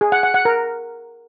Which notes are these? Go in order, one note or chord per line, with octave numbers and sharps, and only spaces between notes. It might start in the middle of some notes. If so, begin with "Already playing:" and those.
G#4
F#5
F#5
F#5
A#4